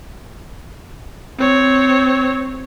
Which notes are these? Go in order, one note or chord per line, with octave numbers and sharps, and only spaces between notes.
C4 C#5